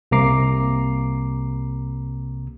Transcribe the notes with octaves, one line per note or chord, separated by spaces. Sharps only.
C2 C3 A#3 A#5 D6 C7